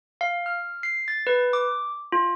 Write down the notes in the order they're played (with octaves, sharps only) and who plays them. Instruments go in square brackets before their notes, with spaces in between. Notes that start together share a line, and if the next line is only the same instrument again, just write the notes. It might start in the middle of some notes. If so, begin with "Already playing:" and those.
[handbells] F5
F6
C7
A6
B4
D6
F4